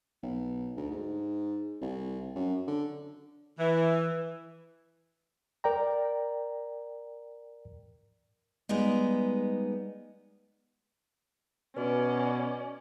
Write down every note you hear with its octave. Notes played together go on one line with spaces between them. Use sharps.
B1
D2
G#2
C2
F#2
D3
E3
A#4 D5 G5 A#5
G3 G#3 B3 D#4
B2 C#4 F#4 B4 D5